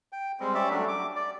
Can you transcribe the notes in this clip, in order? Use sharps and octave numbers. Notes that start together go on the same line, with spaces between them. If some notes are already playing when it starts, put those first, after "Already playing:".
G5
G3 G#3 C4
C#4 G4 D5 E5
F#3 G3 A3 D4
D6
D5